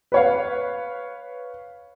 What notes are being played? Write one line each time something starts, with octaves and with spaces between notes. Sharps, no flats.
B4 C#5 F5